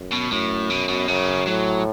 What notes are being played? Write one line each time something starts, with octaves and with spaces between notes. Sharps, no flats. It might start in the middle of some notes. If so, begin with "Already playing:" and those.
Already playing: F#2
B2
F#2 A2
B2
B2
F#2 C#3
A2 F#3